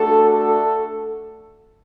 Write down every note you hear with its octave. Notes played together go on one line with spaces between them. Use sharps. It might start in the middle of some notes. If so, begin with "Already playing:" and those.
Already playing: A3 D4 F#4 A4
A4